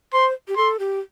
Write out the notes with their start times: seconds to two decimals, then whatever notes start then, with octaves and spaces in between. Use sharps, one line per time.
0.13 C5 C6
0.48 G4
0.56 A4 C6
0.79 G4